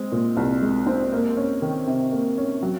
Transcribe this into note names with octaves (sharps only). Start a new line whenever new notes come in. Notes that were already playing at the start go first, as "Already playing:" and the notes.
Already playing: G#3 C4
A#2
C2
G#3
C4
A#3
C#4
D#3
C3
A#3
C#4
F#3